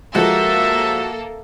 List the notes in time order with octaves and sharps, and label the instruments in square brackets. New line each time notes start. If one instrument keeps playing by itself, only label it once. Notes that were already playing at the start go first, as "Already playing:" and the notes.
[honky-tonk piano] F3 G#3 [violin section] A#3 A4 [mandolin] F#4 [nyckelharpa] E5